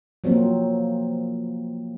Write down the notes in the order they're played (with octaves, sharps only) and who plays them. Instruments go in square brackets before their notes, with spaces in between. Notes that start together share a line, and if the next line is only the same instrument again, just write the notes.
[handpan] F3 F#3 A#3 C4